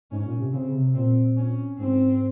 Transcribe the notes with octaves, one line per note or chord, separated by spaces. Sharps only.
G#2 C#4
A#2
C3
C#3 C4
C3
A#2 C4
C#4
G#2 C4